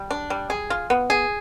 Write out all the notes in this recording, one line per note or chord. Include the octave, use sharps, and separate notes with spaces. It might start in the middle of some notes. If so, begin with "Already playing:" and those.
Already playing: G3
D4
G3
G#4
F4
B3
G#4